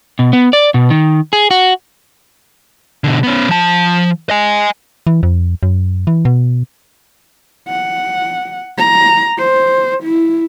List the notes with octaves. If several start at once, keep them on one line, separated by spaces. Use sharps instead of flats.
B2
B3
D5
B2
D#3
G#4
F#4
B2 D3
B3 C#4
F3 A5
D#5 G#5
E3
F2
F#2
E3
B2
F#5
A#5
C5
E4